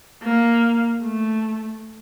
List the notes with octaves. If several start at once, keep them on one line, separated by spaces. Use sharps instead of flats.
A#3
A3